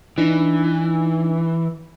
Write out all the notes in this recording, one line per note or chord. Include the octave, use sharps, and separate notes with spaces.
E3 D4 D#4